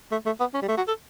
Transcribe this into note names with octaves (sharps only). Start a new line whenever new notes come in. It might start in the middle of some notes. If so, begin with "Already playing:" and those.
A3
A3
B3
C#4
G3
A3
F#4
A4